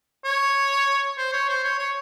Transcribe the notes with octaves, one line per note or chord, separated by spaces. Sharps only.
C#5
C5
C#5
C5
C#5
C#5